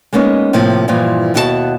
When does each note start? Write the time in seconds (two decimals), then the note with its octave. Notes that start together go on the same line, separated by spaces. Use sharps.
0.13 G#3 A#3 B3 C#4 D#4
0.53 A2 C3 F3 A#3 E4
0.88 G2 A#2 E3 F3
1.34 D#2 B2 E4 F#4 G#4 A5